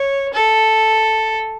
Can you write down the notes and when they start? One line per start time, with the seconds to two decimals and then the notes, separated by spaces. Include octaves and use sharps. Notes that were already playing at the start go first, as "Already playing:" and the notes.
Already playing: C#5
0.33 A4